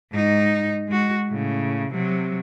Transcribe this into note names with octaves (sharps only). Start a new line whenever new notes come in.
G#2 D#4
G#3 F#4
A2 C#3
C3 F#3